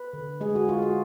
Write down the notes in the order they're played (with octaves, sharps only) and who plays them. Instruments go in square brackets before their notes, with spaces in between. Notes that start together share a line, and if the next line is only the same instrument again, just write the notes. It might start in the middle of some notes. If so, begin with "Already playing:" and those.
Already playing: [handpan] B4
D3
G#3 G#4
F#4
G#3 F4
F#4